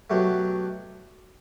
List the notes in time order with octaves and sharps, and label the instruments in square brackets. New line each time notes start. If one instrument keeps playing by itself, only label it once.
[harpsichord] B2 F#3 A3 G4